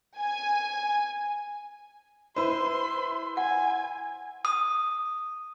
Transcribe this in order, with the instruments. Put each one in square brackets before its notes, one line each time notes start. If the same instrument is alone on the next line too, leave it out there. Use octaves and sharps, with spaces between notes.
[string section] G#5
[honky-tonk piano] E4 B4 C5 [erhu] C6
[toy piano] F#5 [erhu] G#5
[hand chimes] D#6